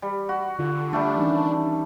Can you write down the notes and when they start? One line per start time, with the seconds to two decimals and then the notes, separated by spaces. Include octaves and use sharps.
0.02 G3
0.29 F#4
0.59 D3 F4
0.93 G3 A3 D4
1.15 D#3 E3 C#4